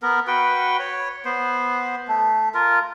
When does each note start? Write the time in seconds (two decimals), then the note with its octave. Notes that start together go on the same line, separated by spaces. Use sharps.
0.02 B3 A#4
0.27 F#4 B4 G5
0.80 C#5
1.25 B3 C5
2.08 A3
2.54 F4 A#4